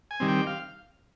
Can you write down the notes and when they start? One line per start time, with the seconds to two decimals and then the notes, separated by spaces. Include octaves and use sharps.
0.11 G#5
0.20 D#3 G3 C4
0.28 G5
0.47 F5